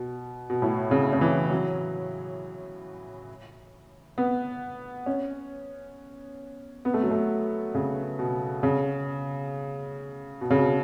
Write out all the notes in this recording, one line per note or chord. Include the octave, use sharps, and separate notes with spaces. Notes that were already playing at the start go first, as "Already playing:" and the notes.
Already playing: B2
B2
A2
C#3
C#3
E3
F#3
B3
C#4
B3
A3
F#3
A3
C#3
B2
C#3
B2
C#3
B2